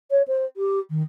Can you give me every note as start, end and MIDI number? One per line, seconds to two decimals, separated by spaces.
0.11 0.22 73
0.27 0.45 72
0.57 0.79 67
0.90 1.02 51